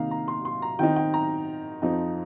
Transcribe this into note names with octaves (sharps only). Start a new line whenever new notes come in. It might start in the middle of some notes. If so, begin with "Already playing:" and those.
Already playing: C3 D#3 A#3 D#4 F5 A#5
A#5
C6
C6
A#5
D#3 C4 D#4 G5
G5
A#5
F2 F3 C4 D#4